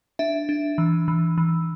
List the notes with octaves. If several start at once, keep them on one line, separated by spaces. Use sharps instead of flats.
D4 E5
D4
E3
E3
E3